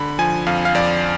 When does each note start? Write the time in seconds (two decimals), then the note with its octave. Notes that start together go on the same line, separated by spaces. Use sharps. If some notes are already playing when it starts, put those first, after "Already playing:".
Already playing: D3 B5
0.19 F3 G#5
0.46 F2 F5
0.65 F5
0.75 F2 D5